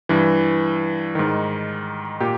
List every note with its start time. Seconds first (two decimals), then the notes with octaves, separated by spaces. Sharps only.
0.09 G2 E3
1.15 G#2 D#3
2.20 A#2 G4